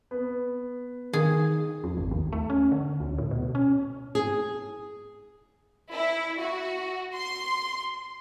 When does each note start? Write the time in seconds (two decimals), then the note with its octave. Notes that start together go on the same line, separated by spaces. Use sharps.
0.11 B3
1.13 D#3 G#4
1.84 F2
1.97 G#1
2.11 D#2
2.32 A3
2.50 C#4
2.72 D3
3.00 D2
3.18 A2
3.31 B2
3.55 C#4
4.15 G#4
5.92 E4
6.40 F#4
7.15 C6